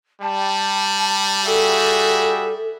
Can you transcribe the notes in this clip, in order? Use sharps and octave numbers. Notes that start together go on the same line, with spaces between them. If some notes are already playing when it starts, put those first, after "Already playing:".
G3 A5
F#4 G#4 A4 E5